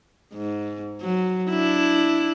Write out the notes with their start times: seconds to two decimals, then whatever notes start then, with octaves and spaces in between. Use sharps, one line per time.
0.34 G#2
1.01 F#3
1.50 D4 E4